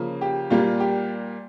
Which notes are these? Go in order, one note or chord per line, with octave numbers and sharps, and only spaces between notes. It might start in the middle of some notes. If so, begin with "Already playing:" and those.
Already playing: C#3 F3 A#3
G4
A#2 G3 A#3 F4
G4